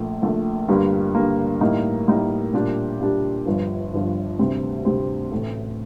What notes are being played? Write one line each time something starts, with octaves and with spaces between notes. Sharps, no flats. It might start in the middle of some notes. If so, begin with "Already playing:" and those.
Already playing: A#1 A#2 A3
A#1 A#2 A3
G2 D3 G3 A#3
G2 D3 G3 A#3
A2 G3 A#3 D#4
A2 G3 A#3 D#4
A#2 G3 D4 G4
A#2 G3 D4 G4
G1 G2 F3
G1 G2 F3
D2 C3 G3 C4
D2 C3 G3 C4
A1 A2 A3